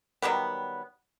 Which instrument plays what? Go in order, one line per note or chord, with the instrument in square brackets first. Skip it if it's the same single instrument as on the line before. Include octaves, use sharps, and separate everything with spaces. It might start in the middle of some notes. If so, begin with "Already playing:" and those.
[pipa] D#3 F#3 G3 B3